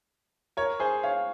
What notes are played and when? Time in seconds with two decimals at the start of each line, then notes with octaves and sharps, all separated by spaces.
0.57 A#4 C#5
0.80 G#4 C5
1.03 C#5 F5